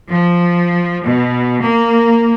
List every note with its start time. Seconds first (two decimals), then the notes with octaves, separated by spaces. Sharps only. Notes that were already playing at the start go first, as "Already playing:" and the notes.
0.10 F3
1.04 B2
1.61 A#3